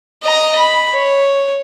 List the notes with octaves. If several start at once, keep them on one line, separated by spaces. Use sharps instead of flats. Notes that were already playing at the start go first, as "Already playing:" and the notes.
D#5 A#5
B5
C#5